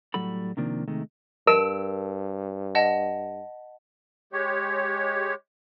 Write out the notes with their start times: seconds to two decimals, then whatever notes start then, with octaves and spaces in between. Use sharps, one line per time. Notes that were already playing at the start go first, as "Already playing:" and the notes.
0.14 A2 F#3 G3 F#4 A4 B5
0.57 C3 D#3 F3 A#3 D4
0.88 C3 D#3 G#3 A3
1.47 G2 A#4 A5 E6 D7
2.75 D#5 F#5 A5
4.33 G#3 G4 C#5